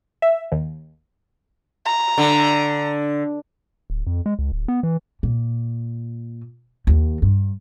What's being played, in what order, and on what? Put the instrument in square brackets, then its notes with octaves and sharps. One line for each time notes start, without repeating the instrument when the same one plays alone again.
[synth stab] E5
D#2
[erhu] A#5
[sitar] D3
[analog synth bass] D1
F2
G#3
C#2
D1
B3
E3
[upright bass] A#2
D#2
G2